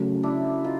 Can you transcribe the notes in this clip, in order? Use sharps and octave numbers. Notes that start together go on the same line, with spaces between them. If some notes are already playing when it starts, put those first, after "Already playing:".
Already playing: C#3 F#3 A3
D4 E4
D#4 F4